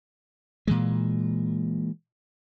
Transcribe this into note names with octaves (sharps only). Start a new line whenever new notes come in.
A#2 E3 G#3